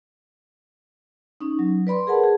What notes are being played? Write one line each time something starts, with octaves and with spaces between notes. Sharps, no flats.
C#4 D#4
F#3
B4 D5 B5 C6
G#4 A#4 F#5 A5
G#4